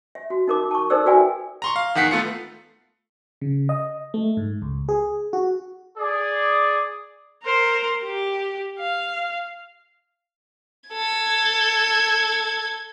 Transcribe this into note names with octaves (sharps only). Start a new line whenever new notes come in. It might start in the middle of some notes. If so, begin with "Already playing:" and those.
E5
F#4
D#4 A#4 D6
A5 C#6
D#4 A4 A#4 C5 D5 E6
F#4 B4 D5 E5 G5 G#5
A#5 C6 C#6
F5
E2 D#3 F#5 B6 C7
A3 B3 F4 C7 C#7
C#3
D#5
A3
G#2
C#2
G#4
F#4
G#4 D5
A#4 C5
G4
F5
A4 G#6